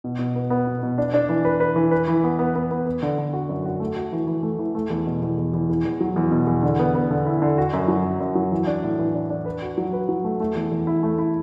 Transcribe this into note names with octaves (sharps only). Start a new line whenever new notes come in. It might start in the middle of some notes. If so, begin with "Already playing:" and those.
B2
B2
B3
B3
B2
B2
D4
D4
E3
B4
B4
E3
B4
E3
B3
B3
B3
B3
B3
D3
D3
F#4
F#2
F#4
A3
F#4
E3
E3
A3
E3
A3
E2
B2
E2
E2
E2
E2
E2
F#3
E2
B2
E2
D3
B3
B3
D3
E4
D3
F#4
F#2
F#3
F#2
F#2
F#3
E3
D4
A2
E3
D4
D4
B4
F#4
F#3
B4
F#3
A3
A3
E2
E2
E4
A3
E4